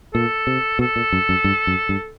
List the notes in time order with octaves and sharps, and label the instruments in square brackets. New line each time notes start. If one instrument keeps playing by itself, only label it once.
[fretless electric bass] A#2 [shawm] A4
[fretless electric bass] C3
[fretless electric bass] B2 [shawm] A4
[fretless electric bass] A#2
F#2
F#2
G2
F#2
G2